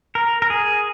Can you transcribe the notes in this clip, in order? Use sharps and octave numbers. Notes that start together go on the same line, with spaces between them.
A#4
A#4
G#4